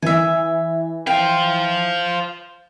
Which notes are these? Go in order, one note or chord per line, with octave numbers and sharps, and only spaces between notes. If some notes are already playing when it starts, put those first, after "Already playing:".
E3 E5 G#5
C5 F5 G5